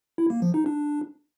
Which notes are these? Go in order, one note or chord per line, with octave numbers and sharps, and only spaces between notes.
E4
A#3
F3
D#4
D4